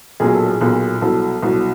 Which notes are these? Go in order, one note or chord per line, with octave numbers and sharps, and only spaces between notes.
B1 A#2 F#3 G#4
A4
G#4
B1 A#2 F#3
C2 B2 F#3 A4
C2 B2 F#3